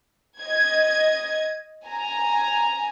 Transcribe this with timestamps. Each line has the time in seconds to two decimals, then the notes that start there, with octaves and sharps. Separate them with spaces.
0.41 D#5 G#6
1.85 G#5 A#5